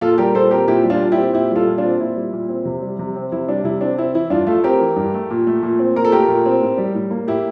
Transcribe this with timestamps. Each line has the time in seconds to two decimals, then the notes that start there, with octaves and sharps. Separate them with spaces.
0.01 A#2 F4 A4
0.18 G3 G4 A#4
0.35 A#2 A4 C5
0.51 C4 G4 A#4
0.67 A#2 E4 G4
0.84 G3
0.90 D4 F4
1.01 A#2
1.12 E4 G4
1.17 C4
1.33 A#2 E4 G4
1.50 G3
1.56 F4 A4
1.67 A#2
1.78 D4 F4
1.84 C4
2.00 A#2 E4
2.16 G3
2.33 A#2
2.49 C4
2.65 C3
2.82 G3
2.99 C3
3.16 C4
3.32 C3 E4
3.48 G3 D4
3.64 C3 E4
3.81 C4 D4
3.98 C4 E4
4.14 E3 E4
4.30 G2 D4 F4
4.47 A3 F4 A4
4.64 C4 G4 A#4
4.80 E3
4.96 G2
5.14 A3
5.30 A#2
5.47 A3
5.63 A#2
5.79 C4
5.96 A#2 A#4
6.05 A4
6.12 A3 G4 A#4
6.28 A#2
6.46 C4
6.62 A2
6.78 G3
6.95 A2
7.11 A#3
7.27 A2 E4 G4